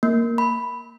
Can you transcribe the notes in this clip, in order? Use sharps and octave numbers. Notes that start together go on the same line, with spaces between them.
A#3
B5